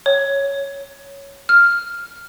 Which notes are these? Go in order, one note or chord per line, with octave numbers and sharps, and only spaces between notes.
C#5
F6